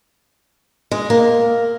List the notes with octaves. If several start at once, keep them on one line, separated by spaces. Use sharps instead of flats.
G#3
A#3